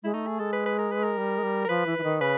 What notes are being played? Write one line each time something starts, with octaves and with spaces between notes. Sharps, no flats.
G#3 E4
A3 D#4
G#4
G#3 A4
B4
B4
A#4
B4
A#4
G3
G#3
G3
A#4
F3 B4
E3
E3
D#3
C#3 B4